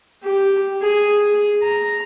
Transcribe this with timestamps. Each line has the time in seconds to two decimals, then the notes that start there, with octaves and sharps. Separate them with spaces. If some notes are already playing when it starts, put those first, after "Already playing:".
0.24 G4
0.82 G#4
1.63 A#5